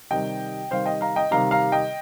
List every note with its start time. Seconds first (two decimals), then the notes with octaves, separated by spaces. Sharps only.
0.11 C3 D#3 G3 D#5 G5
0.71 C3 D#3 G3 C5 F5
0.86 D#5 G5
1.01 F5 A#5
1.16 D#5 G5
1.31 C3 D#3 G3 F5 A#5
1.51 F5 A#5
1.72 D#5 G5